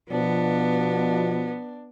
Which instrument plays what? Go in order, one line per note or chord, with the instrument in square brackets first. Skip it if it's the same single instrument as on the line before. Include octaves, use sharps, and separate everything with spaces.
[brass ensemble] B2 F3 [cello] B3 [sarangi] D4